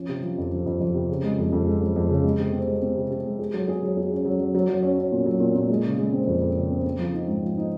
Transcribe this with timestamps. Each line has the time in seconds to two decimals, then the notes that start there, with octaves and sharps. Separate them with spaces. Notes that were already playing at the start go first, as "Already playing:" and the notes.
Already playing: F3 C#4
0.09 C3
0.22 F3
0.38 F2
0.52 F3
0.66 F2
0.80 F2
0.95 C3
1.09 C#3
1.23 G#3
1.39 F2
1.53 F2
1.66 G#3
1.81 F2
1.96 F2
2.10 C#3
2.24 G#3
2.39 C3
2.52 C4
2.67 G#3
2.82 C4
2.97 C3
3.10 C3
3.26 G#3
3.39 G#4
3.54 F#3
3.68 G#4
3.83 F#3
3.97 G#4
4.12 C#4
4.25 F#3
4.40 F#3
4.55 F#3
4.69 F#3
4.83 C#4
4.98 C#4
5.12 A#2
5.26 F#3
5.40 A#2
5.55 A#2
5.70 G#3
5.85 C#3
5.98 G#3
6.13 C4
6.27 F2
6.41 F2
6.56 C#3
6.71 C4
6.84 C4
6.99 F3
7.14 D#4
7.28 G#2
7.43 F3
7.57 D#4